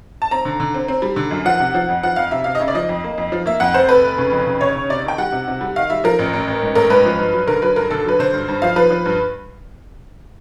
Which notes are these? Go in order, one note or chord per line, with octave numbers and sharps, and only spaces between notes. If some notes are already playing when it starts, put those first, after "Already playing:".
A5
C4 A#5
D3
D3
C4
C4
G3
D3
F#2
F3 F#5
C3
F3
F2
F3 F#5
F2 F5
C3 E5
C3 F5
D#5
C#3 E5
D5
F3 D#5
F2
A#3
F2
F3
A#3 E5
F2 F#5
F1 C5
F1 B4
F1
C#3
F2
C#3
C#3 C#5
C#3
C3 D5
D#3 G5
G3 F#5
C3
C3
G3
D#3 F5
G3 E5
F3 A#4
A1
A1
A1
G#2
A1 A#4
G#2 B4
F3
G2
F#3
D3 A#4
F#3 B4
G2 A#4
D3 A4
F#3 B4
D3 C5
G2
G2
F3 F5
F3 B4
F3
G2